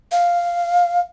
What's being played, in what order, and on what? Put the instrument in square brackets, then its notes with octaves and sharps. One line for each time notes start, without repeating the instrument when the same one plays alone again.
[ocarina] F5